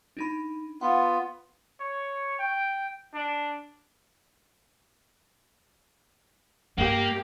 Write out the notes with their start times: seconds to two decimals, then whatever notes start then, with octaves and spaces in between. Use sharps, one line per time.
0.17 D4 D#4 B5
0.81 B3 F4 F#5
1.80 C#5
2.39 G5
3.14 D4
6.78 G2 A#3 G4